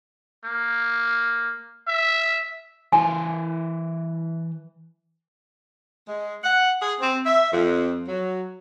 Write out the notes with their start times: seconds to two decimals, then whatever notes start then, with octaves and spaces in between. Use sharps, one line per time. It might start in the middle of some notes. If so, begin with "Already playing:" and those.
0.45 A#3
1.88 E5
2.93 E3 C5 G#5
6.08 G#3
6.44 F#5
6.81 G#4
7.00 C4
7.26 E5
7.52 F2
8.08 F#3